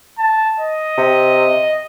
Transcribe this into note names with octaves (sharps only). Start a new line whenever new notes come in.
A5
D#5
C3